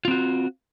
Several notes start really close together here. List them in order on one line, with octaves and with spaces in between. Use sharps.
F4 C4 F#4